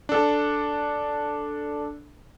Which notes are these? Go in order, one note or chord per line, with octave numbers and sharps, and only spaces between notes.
D4 A4